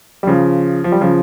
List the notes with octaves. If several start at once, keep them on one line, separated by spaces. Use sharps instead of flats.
G3
C#3 F3
F3
G3
C#3 F3